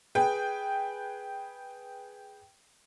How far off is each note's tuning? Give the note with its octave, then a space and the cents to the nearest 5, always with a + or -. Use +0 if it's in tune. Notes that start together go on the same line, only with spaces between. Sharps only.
G#4 +0 B4 -5 G5 +0